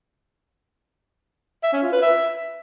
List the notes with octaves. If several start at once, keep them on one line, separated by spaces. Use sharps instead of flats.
E5
C#4
F4
B4
E5